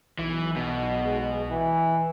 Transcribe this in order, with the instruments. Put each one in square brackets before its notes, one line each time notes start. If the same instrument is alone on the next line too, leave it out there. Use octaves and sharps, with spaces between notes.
[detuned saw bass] B1 [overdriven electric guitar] E3
[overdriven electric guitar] B2
[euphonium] G#3
E3